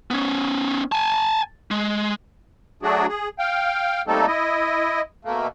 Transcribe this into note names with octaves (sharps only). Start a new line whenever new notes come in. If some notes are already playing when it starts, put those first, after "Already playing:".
B3 C#4
G#5 A5
G#3
F#3 A3 D4 F#4 G#4
G#4
F5 G5
G3 A3 A#3 C4 D#4 A4
E4 D#5
B2 A3 A#3